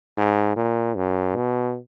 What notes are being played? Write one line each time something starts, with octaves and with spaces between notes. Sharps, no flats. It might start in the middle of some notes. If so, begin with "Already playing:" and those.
G#2
A#2
F#2
B2